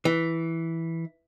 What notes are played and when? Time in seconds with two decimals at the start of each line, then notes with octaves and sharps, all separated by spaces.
0.05 E3